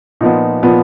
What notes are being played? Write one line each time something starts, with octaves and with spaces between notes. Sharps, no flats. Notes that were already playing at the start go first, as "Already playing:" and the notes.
A#2 F3 B3 D#4
A#2 F3 B3